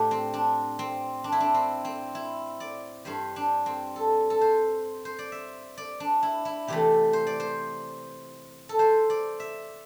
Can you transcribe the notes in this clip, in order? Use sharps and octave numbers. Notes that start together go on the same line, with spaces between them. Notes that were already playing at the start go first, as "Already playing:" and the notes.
Already playing: A2 A3 D4 G4 C5
C4
D4
C4
D4
E4
D4
C4
C4
E4
D5
G2 G3 C5
D4
C4
A4
A4
C5
C5
D5
E5
D5
D4
E4
E4
C3 E3 A3 G4
C5
D5
C5
A4
C5
D5
E5